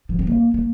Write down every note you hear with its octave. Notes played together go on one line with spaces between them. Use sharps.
F3
C4
A#3
A#3